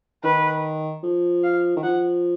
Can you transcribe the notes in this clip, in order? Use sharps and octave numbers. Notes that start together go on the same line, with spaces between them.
D#3 B4
F3
F5
D#3
F3 F#5